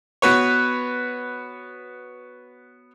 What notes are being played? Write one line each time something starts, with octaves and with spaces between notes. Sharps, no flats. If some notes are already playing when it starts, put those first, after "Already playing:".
B3 F#4 B4 C#5